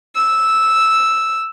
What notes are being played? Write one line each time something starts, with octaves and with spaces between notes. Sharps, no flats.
E6